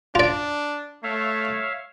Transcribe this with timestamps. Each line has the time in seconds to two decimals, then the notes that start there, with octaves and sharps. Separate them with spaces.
0.15 D4 F4 D5
1.03 A3 C#5 E5 F5